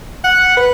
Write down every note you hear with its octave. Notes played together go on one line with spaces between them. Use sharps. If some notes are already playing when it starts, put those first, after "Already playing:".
F#5
B4